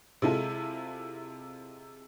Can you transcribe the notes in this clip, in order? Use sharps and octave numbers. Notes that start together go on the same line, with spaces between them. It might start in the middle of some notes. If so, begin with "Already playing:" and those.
C3 G#3 E4 F4 A4